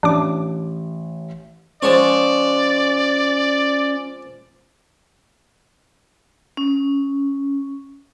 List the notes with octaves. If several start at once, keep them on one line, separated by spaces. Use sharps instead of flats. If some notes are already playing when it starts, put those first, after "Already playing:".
A1 D4 D6
F3 G#3 C#4 C#5 D5
C#4